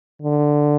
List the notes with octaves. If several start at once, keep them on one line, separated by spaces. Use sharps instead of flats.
D3